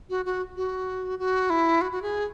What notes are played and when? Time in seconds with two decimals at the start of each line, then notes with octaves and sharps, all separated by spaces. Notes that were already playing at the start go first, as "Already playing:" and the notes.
0.10 F#4
0.25 F#4
0.56 F#4
1.19 F#4
1.50 E4
1.81 F#4
1.92 F#4
2.02 G#4